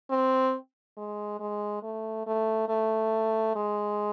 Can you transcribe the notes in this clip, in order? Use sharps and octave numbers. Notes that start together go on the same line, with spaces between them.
C4
G#3
G#3
A3
A3
A3
G#3